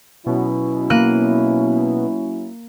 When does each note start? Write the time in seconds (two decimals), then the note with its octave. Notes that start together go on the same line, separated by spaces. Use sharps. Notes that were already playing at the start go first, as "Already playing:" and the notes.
0.26 B2 F#3 C#4 E4
0.90 A#3 F#6 D#7